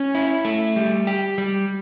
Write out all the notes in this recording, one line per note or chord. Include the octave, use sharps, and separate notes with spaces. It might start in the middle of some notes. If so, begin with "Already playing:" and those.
Already playing: C#4
E4
A3
G3
G4
G3